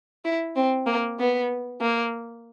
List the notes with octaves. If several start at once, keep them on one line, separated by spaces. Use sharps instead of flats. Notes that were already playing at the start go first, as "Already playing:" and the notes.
E4
C4
A#3
B3
A#3